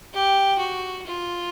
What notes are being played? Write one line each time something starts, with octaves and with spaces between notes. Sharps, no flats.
G4
F#4
F4